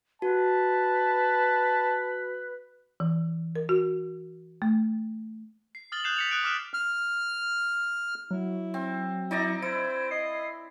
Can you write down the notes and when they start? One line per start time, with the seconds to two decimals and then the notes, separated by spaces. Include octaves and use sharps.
0.22 F#4 B4 A5
3.00 E3
3.56 A#4
3.69 F#4
4.62 A3
5.75 C7
5.92 D#6 F6 A6 F#7 G7
6.04 D#6 F#6 G6 C7 E7 F7
6.16 B6 C#7 F7
6.31 D#6 F#6 D7
6.44 D6 D#6 F6 F#6 E7
6.74 F6
8.31 F#3 E4
8.74 C4
9.31 D#4 E4 D5 A#5
9.62 E4 C5 D7
10.11 D#5 C7